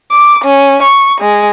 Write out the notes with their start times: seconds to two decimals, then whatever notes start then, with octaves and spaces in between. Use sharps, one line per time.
0.11 D6
0.44 C#4
0.83 C#6
1.20 G#3